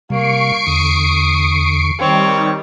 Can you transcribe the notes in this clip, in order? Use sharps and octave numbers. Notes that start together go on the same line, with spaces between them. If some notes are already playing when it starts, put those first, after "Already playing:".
C3 G3 A#3 C#6 C7 D7
E2 D3 D#6
D#3 G3 C4 C#5